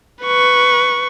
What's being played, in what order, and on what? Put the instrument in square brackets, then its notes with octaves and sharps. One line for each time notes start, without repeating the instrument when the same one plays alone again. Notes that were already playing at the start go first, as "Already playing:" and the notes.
[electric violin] B4 C#6